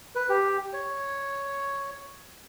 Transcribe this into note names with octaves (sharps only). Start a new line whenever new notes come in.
B4
G4
C#5